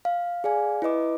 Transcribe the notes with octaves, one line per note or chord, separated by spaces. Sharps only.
F5
G#4 D5 F5 G#5
E4 B4 D#5 D6